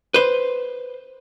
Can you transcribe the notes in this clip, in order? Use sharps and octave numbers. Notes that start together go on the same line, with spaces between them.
B4 C5